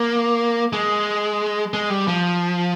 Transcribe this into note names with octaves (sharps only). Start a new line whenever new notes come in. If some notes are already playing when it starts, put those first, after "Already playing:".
Already playing: A#3
G#3
G#3
G3
F3